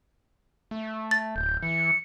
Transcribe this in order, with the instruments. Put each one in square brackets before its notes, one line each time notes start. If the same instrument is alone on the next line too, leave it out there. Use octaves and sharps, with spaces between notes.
[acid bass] A3
[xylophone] A6
[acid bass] D1 [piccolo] G6
[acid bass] E3 [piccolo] C#7